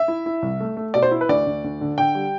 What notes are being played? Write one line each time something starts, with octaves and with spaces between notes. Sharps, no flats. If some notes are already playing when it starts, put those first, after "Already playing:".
Already playing: E5
E4
E4
C2
A3
A3
B2 D5
C5
E4
B4
D2 D5
D2
D2
D3
D3 G5
G3